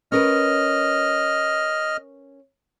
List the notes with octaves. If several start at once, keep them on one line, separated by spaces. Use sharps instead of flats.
C#4 A#4 B4 D#5 F6